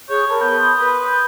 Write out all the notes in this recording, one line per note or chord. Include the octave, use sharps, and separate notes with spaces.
G#4 C#5 F#6 G6
A#4 A5 B5
B3 G6
C6 D#6
B4
G6